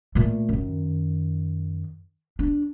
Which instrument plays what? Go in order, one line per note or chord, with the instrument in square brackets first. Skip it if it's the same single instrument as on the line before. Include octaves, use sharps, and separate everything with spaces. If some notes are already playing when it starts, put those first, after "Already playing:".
[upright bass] A#2 A3
F#2 D#3
D4